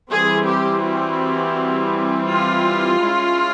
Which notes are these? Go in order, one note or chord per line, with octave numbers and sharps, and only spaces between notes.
E3 G3 C4 G#4
G4
F#4
F4
G#3 C#4 E4